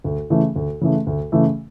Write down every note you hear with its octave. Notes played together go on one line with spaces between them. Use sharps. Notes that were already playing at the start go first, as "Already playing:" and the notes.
D2
C#3 E3 A3
D2
C#3 E3 A3
D2
C#3 E3 A3